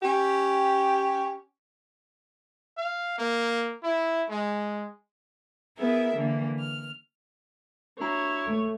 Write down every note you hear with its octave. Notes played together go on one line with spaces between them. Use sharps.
C#4 G4
F5
A#3
E4
G#3
B3 E4 G#4 A#4 E5
D3 E3 A#3
F6
D4 E4 F#4 C#5 A#5
A3